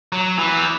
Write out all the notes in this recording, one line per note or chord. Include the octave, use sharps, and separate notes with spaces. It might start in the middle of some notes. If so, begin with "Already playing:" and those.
F#3
E3
B3